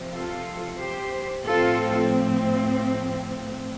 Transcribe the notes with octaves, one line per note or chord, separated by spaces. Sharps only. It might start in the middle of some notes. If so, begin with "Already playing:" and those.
Already playing: C3 F3 C4
F4 A4
G4 C5
A2 F3 C4 F4 A4